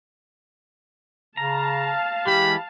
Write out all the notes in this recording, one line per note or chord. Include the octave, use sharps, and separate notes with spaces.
C#3 F5 A5 A#5
E3 G#3 G4 B5